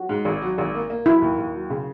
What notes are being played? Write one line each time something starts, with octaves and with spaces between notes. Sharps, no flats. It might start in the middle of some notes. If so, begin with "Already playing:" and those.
Already playing: F#4
G#2
G#1
F#3
G#1
A#3
A#3
F#3 E4
D#2
D#2
F#3
C#3